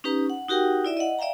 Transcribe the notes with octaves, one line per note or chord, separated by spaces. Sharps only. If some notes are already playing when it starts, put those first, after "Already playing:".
C#4 D#4 G4 B4 A#5
F#5
D#4 F#4 G4 A#4 F#5 G5
E4 D5 E5
D#5 F#5
D5 E5 F5 G5 A#5